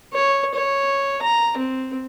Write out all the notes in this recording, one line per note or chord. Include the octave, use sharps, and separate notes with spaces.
C#5
C#5
A#5
C4